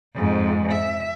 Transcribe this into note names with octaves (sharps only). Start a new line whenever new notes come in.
F2 G#2
E5